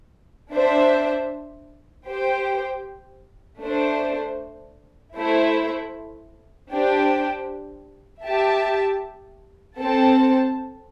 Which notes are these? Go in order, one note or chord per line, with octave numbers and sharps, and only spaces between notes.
D4 C5 E5
G4 C5 G5
A3 D4 C5
A3 E4 C5 E5
D4 G4 C5 G5
G4 E5 A5
C4 A4 C5 A5